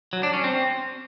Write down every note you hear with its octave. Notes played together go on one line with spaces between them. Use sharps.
F#3
D4
C#4
C4